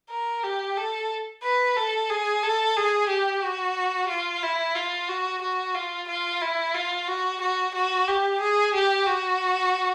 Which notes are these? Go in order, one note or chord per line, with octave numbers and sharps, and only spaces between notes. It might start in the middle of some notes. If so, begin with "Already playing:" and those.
A#4
G4
A4
B4
A4
G#4
A4
G#4
G4
F#4
F4
E4
F4
F#4
F#4
F4
F4
E4
F4
F#4
F#4
F#4
G4
G#4
G4
F#4